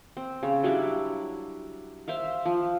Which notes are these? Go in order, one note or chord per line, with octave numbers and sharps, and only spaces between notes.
C4
C#3
F#3 G3 D4 E4
C5 E5 F5
F3